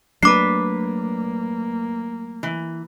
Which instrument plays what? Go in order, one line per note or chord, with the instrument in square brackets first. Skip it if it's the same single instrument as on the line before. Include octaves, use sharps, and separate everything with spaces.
[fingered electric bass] F#3 A3 [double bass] A#3 [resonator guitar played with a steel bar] D4 B4 [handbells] D6 C7
[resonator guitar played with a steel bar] E3